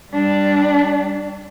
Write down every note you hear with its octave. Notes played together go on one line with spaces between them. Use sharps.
G3 D4